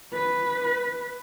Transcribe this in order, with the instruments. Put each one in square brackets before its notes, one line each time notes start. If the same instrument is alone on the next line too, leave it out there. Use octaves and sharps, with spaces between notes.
[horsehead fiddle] B4